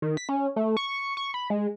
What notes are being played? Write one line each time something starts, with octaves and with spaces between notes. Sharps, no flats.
D#3
B6
C#4
A3
C#6
C#6
B5
G#3